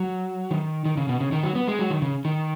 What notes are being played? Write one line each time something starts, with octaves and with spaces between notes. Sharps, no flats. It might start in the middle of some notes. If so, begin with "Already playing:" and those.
Already playing: F#3
D#3
D#3
C#3
B2
C#3
D#3
F#3
B3
G#3
F#3
D#3
C#3
D#3